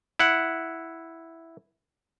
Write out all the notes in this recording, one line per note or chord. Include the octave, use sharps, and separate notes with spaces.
E4 F#5